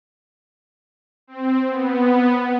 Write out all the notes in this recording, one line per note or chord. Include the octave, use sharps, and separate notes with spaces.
C4
B3